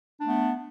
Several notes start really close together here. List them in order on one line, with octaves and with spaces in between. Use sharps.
D4 A3 B3